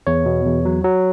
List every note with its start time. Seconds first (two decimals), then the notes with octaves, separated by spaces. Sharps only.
0.07 E2 C#5
0.26 B2
0.45 E2
0.65 F#3
0.84 F#3